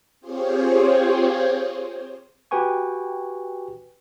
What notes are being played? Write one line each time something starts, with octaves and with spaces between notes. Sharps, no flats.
C4 F4 G4 G#4 C5 C#5
F#4 G4 B4 G5 G#5 C#6